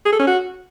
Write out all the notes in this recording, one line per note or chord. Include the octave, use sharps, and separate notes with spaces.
G#4
A4
C#4
F#4